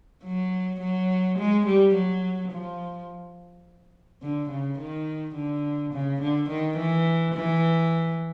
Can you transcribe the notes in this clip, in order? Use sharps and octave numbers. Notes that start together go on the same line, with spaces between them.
F#3
F#3
G#3
G3
F#3
F3
D3
C#3
D#3
D3
C#3
D3
D#3
E3
E3